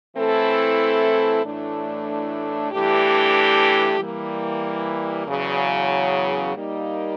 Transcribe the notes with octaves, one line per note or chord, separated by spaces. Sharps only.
E3 A3 C4 E4 A4
A2 E3 A3 D4
G2 E3 A3 D4 G4
E3 G3 A#3
E2 C#3 F#3
G3 A#3 D#4